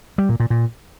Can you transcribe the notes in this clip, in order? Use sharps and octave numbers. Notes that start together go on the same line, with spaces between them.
G3
A#2
A#2
A#2